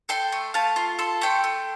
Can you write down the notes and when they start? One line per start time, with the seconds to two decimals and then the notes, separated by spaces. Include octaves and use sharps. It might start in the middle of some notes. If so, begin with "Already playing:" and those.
0.09 A4 G5 C6
0.32 A3
0.54 A3 F5 A5
0.76 F4
0.99 A4 C6
1.21 A3 G5 C6
1.44 A3